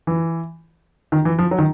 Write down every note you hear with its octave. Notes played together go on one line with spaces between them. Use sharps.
E3
D#3
E3
F3
F#3
D#3